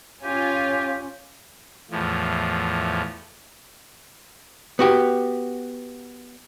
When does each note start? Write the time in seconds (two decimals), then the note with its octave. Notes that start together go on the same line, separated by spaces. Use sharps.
0.24 C#4 F4 G4 G#5
1.91 E2 A2 F3
4.79 B3 F#4 G4